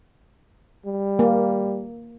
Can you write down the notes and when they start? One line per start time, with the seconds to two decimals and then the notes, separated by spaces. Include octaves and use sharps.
0.86 G3
1.19 A#3